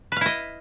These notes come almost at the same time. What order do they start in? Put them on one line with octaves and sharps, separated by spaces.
B4 F5 E4 D#5